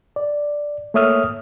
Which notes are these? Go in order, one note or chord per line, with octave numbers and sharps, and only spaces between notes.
D5
A3 A#3 C#5 E5 D#6 F6